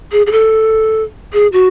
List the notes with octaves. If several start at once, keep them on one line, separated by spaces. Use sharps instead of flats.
G#4
G#4
A4
G#4
F#4